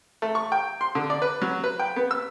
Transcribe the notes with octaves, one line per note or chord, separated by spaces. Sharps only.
A3
C#6
G5
C6
D3
D5
B4
F#3
B4
G5
B3
E6